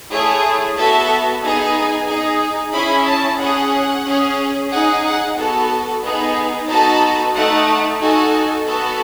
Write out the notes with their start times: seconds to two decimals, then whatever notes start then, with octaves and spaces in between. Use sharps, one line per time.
0.11 A3 E4 G#4 C#5
0.76 B3 F#4 A4 E5
1.42 B3 D#4 G#4 G#5
2.08 D#4 G#4
2.74 C#4 E4 G#4 B5
3.08 A5
3.40 C#4 G#4 F#5
4.06 C#4 G#4
4.71 D#4 G#4 F#5
5.04 F#5
5.37 B3 F#4 A4
6.03 B3 D#4 G#4
6.69 B3 D#4 F#4 A4 A5
7.34 A3 D#4 A4 F#5
8.00 D#4 F#4 A4 G#5
8.66 B3 F#4 A4